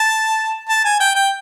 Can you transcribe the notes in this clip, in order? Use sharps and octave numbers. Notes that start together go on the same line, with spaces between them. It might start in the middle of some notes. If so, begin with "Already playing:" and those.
Already playing: A5
A5
G#5
G5
G5